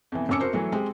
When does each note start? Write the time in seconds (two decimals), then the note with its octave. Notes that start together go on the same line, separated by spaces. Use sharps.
0.12 F2 B2 E3
0.29 F1 F#2 C#4 D6 E6 C#7
0.41 F#4 A#4 C5
0.53 E3 F#3 A3
0.72 G#3 C4 G4